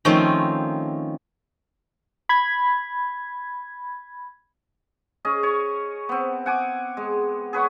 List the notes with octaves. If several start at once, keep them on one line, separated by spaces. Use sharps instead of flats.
D#3 F3 A3 C4 C#4 F4
B5 G#6
C#4 G#4 D#5
C#5
B3 C4
F#5 G#5 D6
G#3
G#4 B4 C#5 F#5